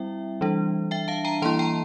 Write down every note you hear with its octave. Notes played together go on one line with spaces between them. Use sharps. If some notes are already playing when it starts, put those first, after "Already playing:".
Already playing: G3 C4 E4 E5 G5
E3 G3 D4
E5 G5
F5 A5
G5 A#5
E3 A#3 E4 A5 C6
G5 A#5